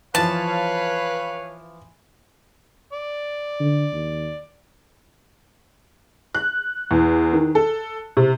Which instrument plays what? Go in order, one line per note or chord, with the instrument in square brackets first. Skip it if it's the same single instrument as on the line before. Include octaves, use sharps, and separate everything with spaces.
[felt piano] E3 F3 [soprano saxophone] B4 [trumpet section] C#5 F5 [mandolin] A5
[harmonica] D5
[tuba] D3
D#2
[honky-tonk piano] F#6
E2
D#3
A4
C3